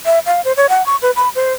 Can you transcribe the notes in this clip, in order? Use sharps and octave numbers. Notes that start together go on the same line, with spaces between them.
E5
F5
C5
C#5
F#5
C#6
B4
B5
C5